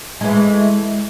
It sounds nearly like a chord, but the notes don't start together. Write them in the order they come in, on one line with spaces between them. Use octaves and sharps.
G#3 E3 A3